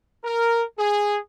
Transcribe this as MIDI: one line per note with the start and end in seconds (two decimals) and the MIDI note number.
0.24 0.62 70
0.78 1.17 68